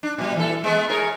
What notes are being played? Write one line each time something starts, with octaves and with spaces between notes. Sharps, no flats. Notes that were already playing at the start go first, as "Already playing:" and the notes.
D4
A#2 G3
E3 A4
G#3 A3 B3
G#4 A#4 C#5